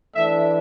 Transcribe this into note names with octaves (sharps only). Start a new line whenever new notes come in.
E3 A3 D4 E5